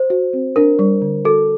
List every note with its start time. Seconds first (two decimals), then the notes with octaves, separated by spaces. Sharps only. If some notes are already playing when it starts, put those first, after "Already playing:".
Already playing: C5
0.10 F#4
0.33 C4
0.56 D4 A#4
0.79 G3
1.02 D3
1.25 F#4 A4